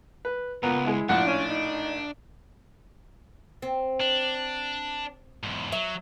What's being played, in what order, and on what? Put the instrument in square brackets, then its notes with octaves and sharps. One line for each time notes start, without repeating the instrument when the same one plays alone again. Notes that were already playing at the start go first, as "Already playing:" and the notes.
[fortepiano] B4
[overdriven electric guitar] C#2 [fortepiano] A#2 A#5 [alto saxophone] B3
[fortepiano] G#3 E4
[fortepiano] A#1 A2 F4 [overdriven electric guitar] D4 [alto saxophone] F#5
[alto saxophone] C#4
D#4
[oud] C4
[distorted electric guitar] D4
E2 G#2
[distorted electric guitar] F#3 [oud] E5